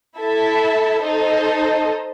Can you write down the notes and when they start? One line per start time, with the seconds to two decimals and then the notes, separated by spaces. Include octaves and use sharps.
0.18 E4 A4 E5 A5
1.03 D#4 A4 C5 D#5